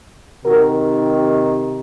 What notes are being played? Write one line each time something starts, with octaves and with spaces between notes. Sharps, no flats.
C3 D#3 F#4 A#4